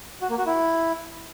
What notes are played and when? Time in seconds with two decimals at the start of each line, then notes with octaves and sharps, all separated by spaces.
0.21 F#4
0.30 A#3
0.38 F#4
0.46 E4